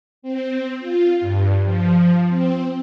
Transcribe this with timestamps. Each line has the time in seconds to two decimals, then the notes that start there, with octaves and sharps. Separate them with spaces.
0.22 C4
0.79 F4
1.20 G2
1.63 F3
2.28 C4